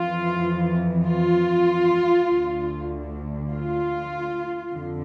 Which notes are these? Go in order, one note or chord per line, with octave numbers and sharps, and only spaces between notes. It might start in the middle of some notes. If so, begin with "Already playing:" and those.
Already playing: F2 E3 F4
F4
D2 D3
F4
F2 D3